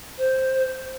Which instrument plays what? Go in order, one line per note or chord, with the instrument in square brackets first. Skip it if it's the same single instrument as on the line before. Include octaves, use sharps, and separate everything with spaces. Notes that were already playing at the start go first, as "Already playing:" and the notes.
[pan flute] C5